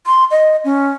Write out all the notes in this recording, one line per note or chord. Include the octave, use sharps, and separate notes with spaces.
C6
D#5
C#4